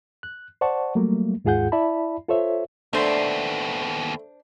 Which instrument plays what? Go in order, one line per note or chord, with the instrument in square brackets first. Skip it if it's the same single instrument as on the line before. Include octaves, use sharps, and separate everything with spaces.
[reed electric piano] F#6
C5 D5 F#5 A5 C#6
F#3 G3 A3 A#3
D#2 G#2 F4 G#4 F#5 G6
E4 D5 E5 A5 B5
F4 A4 C5 C#5 E5
[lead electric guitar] D#2 B3 [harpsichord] A3 [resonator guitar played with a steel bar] D4 C5